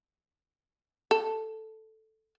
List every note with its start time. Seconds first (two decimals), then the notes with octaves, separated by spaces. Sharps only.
1.11 A4